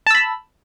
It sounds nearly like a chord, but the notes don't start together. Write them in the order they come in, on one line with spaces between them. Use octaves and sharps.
A5 E6 B5